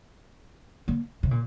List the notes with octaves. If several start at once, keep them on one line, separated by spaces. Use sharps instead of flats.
A#3
C3
A#2